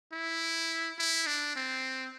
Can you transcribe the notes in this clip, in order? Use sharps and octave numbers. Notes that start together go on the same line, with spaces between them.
E4
E4
D4
C4